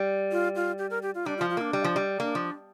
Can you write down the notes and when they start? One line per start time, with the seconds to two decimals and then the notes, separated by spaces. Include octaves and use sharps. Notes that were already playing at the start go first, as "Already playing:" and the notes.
Already playing: G3
0.32 F4
0.56 F4
0.78 G4
0.90 A#4
1.02 G4
1.15 F4
1.26 G3 D4
1.37 F4
1.41 F3
1.50 F4
1.57 A#3 D4
1.73 G3
1.84 F3
1.96 G3
2.19 A#3 D4
2.35 F3